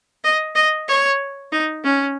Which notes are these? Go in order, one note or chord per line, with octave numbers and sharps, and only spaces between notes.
D#5
D#5
C#5
D#4
C#4